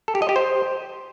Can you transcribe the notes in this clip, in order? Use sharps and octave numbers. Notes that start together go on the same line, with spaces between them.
A4
G4
D#5
G4
C5